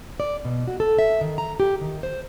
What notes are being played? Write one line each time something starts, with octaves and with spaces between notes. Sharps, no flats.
D5
B2
F#4
A4
E5
D#3
A#5
G4
D#3
C5